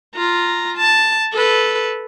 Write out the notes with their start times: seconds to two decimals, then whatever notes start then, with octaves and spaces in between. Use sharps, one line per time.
0.15 F4 A#5
0.78 A5
1.33 A4 B4